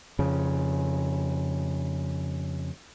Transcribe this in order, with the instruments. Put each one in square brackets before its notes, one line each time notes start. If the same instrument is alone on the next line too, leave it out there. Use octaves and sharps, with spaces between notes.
[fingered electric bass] F2 C#3